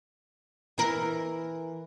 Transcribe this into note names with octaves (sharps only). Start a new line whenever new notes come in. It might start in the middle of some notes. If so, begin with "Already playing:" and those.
E3 A#4